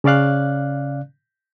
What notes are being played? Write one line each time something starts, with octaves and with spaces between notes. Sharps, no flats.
C#3 C#4 D5 F5 F#6